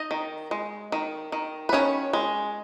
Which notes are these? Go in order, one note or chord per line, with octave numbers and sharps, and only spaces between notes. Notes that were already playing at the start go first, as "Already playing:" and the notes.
Already playing: D#4 D#5
D#3
G#3
D#3
D#3
B4
D#3 C#4 C#5
G#3